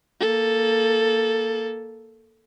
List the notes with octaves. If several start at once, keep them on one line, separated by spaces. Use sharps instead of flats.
A#3 A4